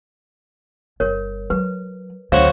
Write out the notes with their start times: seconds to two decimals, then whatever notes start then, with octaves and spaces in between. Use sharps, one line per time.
1.00 G1 A#4 C#5
1.50 F#3 B4
2.32 D2 F#3 B3 F#4 C5 C#5 F5